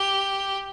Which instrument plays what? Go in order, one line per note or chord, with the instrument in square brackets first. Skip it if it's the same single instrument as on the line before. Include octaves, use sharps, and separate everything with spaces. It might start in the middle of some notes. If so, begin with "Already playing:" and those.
Already playing: [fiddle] G4